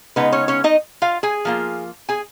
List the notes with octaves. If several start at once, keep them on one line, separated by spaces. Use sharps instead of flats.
C#3 G#3 B3 D#4 B4
C#4 C#5
C#4 C#5
D#4 D#5
F4 F5
G#4 G#5
F3 A#3 F4
G#4 G#5